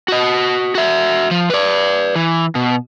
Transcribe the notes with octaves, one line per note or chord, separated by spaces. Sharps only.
F#4 D#5
F#4 E5
F3
B4 D5
E3
B2